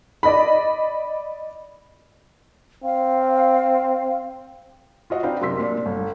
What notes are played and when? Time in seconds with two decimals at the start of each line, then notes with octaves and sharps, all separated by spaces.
0.23 D5 D#5 B5
2.84 C4 F5
5.10 F4 F#4 D#5 F#5
5.23 C4 D4 D#4 B4 F5 G5
5.41 F#2 C3 A#4 C6 E6 B6
5.60 A#2 D4
5.86 G1